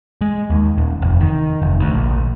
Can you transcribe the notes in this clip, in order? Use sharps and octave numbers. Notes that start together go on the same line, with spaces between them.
G#3
D#2
D#1
F1
D#3
F1
D2
A#1